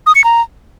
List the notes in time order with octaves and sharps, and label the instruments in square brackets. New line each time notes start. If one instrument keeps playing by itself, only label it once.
[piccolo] D#6
C#7
A#5